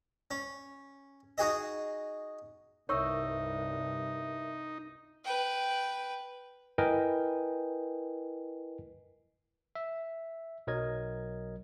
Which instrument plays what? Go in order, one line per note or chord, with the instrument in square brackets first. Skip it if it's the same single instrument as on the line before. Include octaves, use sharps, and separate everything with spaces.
[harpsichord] C#4
D#4 F#4 G#4 D#5
[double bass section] C2 G2 [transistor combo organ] D#4 [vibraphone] A#4 E5 [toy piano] C#5 C#6 E6
[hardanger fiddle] B4 G5
[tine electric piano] E4 A#4 B4 D#5 G5 G#5
E5
B1 F#3 A#4 D#5 G#6